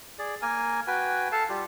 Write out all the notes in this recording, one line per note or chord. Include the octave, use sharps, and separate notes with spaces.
G#4 D5
A#3 A#4 G#5
F#4 B4 G5 G#5
A4 F5 A5
G3 F4 G4